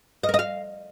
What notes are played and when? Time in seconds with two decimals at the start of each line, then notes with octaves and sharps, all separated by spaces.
0.23 D#5
0.29 A#4
0.34 D#5
0.39 F5